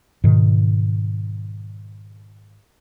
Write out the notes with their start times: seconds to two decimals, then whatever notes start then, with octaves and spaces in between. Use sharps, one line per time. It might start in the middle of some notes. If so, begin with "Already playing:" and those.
0.24 G#2 B2 D#3